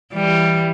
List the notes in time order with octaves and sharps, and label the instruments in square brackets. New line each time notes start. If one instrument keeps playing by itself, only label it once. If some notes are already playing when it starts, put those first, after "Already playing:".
[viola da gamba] E3 G3